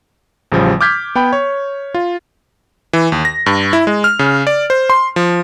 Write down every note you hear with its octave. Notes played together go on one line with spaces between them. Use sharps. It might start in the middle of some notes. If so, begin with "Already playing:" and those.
A1 C#3 F3 G3
D6 F6 G6 G#6 B6
B3 G5 B5
C#5
F4
E3
D#2
A#6
G2
E4
G#3
F6
C#3
D5
C5
C6
F3